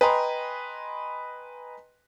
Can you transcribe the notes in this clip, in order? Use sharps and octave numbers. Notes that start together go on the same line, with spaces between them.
B4 D#5 G5 G#5 A#5 C6